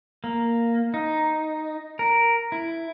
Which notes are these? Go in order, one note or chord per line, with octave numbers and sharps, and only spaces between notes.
A#3
D#4
A#4
E4